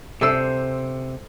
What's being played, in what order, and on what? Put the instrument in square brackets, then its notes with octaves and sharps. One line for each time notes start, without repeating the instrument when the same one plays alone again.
[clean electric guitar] C3 [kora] A4 C5 D5 [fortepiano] E5 E6